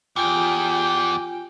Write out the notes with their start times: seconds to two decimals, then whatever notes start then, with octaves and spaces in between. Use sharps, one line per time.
0.16 E2 F4 G4 G5 G#5